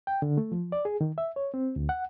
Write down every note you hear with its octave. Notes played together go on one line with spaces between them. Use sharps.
G5
D3
A3
F3
D5
G#4
D#3
E5
C#5
C4
D2
F#5